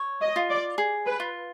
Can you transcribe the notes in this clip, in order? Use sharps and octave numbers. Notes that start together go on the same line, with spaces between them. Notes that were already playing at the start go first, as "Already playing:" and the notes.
Already playing: C#5
D#5
F4
D5
G#4
B4
F4